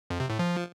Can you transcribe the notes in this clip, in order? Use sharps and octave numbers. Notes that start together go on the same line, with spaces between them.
F2
C3
A2
F3